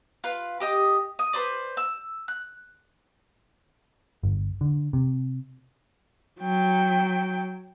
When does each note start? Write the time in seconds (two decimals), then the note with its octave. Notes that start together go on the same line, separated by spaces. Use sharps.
0.24 F4 B4
0.60 G4 D#5 D#6
1.19 D#6
1.33 B4 C5 D5
1.77 E6
2.28 F#6
4.23 G1
4.61 D3
4.93 C3
6.40 F#3 G5